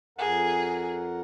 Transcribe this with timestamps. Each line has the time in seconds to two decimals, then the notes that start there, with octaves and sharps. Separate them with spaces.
0.18 F2 G#4 A#4 F#5